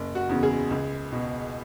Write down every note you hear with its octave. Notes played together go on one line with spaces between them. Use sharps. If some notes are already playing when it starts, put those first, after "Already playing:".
Already playing: F#1
F#4
E2 C#3
G#4
C#2
B2